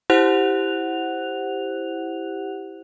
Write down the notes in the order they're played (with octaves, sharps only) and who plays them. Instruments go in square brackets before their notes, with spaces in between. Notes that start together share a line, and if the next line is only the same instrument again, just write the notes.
[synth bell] E4 G4 C5 F#5 F#6 F7